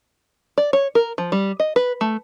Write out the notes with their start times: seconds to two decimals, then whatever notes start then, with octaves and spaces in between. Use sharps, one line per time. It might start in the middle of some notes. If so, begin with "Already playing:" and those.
0.58 D5
0.73 C#5
0.95 A#4
1.18 F3
1.32 G3
1.60 D#5
1.76 B4
2.01 A3